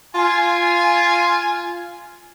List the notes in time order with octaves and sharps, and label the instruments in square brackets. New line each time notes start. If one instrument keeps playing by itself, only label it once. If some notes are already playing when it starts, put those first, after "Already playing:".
[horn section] F4 G#5